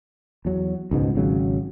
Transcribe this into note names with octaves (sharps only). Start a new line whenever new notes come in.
E2 F#3
C#2 G#2 B2
G#1 C#3 F#3